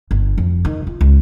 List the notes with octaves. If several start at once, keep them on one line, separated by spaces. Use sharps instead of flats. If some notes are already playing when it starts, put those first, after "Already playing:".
G1
F2
D#3
F4
C#2